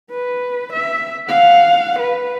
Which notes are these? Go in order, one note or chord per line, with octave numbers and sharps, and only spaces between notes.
B4
E5
F5 F#5
B4